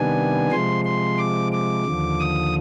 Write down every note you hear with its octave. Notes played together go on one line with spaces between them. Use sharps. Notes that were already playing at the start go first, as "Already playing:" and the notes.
Already playing: C3 D#3 G3 B3 D4 G#5
C3 F3 G#3 C6
C6
D6
D6
D#2 D3 F3
D#6